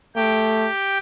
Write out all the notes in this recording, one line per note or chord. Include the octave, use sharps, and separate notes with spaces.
A3 G4 G5